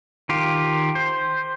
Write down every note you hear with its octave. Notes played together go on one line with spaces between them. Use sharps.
D#3 F4 G4
C5